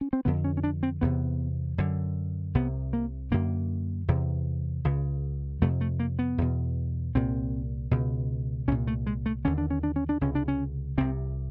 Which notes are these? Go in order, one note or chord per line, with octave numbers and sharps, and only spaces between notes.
C#4
C4
F2 D3 B3
C#4
C#4
D4
C4
E2 C3 B3
F#2 D3
C2 C3 B3
A#3
F#2 D3 A#3
E2 C3
C#2 C#3
F2 C3 A3
A3
A#3
B3
E2 B2
C2 A#2 C4
C#2 B2
C2 A#2 C#4
A3
G#3
A3
D#2 D3 C#4
D4
C#4
D4
C#4
D4
C#2 C3 C#4
D4
C#4
C2 C3 C4